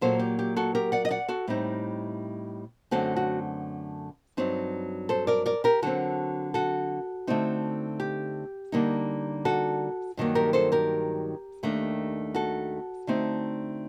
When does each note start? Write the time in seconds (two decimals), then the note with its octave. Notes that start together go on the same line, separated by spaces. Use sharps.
0.01 A#2 F#3 A#3 A4 C5
0.20 G4
0.39 G4
0.57 F#4 A4
0.75 G4 A#4
0.92 D5 F#5
1.05 D#5
1.10 D5 F#5
1.28 F#4 A4
1.48 A2 G3 C4 D#4
2.91 F#2 D3 A3 C4 F#4 A4
3.16 F#4
4.37 G2 F#3 C4 D#4
5.09 A4 C5
5.27 A#4 D5
5.46 A#4 D5
5.64 G4 A#4
5.82 D3 F#3 C4 F#4 A4
6.54 F#4 A4
7.27 D3 A3 C4 D#4
8.00 G4
8.72 D3 G3 A#3 D#4
9.45 F#4 A4
10.17 G2 D#3 F#3 A#3
10.35 G4 A#4
10.53 A4 C5
10.72 G4 A#4
11.63 D#2 D#3 A3 D4
12.35 F#4 A4
13.07 D3 A3 C4 D#4